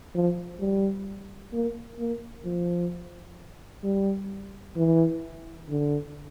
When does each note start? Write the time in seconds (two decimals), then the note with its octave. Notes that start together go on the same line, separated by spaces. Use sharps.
0.15 F3
0.60 G3
1.53 A#3
1.99 A#3
2.45 F3
3.84 G3
4.76 E3
5.69 D3